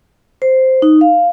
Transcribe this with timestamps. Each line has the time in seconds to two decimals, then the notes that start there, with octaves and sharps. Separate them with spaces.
0.42 C5
0.82 D#4
1.01 F5